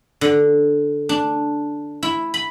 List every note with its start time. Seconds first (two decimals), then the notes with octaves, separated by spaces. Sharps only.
0.21 D3
1.09 D4
2.03 E4
2.34 B5